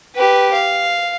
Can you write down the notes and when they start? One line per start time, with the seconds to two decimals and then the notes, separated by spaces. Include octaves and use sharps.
0.16 G4 B4
0.54 F5